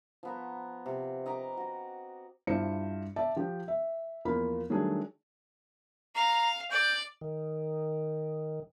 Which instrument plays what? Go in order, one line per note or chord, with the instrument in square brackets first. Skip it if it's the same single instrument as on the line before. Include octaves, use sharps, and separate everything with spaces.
[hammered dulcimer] F3 B3 A#5
C3
D#5 A#5 B5 D6
F#4
[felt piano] G2 E4 F4 C5 C#7
D5 E5 A5
F3 G4
E5
E2 F3 A#3 F4 B5
D#3 F#3 G3 A3 D4 G#4
[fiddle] F5 [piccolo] A#5
[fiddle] D5 [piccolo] G6
[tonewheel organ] D#3